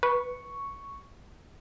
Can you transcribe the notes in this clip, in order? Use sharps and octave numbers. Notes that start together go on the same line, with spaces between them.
B4 C#6